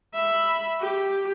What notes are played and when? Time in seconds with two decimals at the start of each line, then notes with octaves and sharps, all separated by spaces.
0.14 E5 B5
0.80 G4